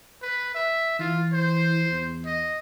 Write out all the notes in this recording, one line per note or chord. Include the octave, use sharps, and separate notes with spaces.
B4
E5
E3 F4
C5
E2
D#5